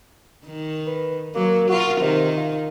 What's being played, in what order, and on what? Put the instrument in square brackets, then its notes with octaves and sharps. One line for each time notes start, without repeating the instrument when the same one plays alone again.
[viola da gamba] D#3
[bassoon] B4
[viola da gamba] F#3 [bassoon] A#3
[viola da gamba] F4 A#4 [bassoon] F#4
[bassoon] C3 [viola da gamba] D#3
[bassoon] F4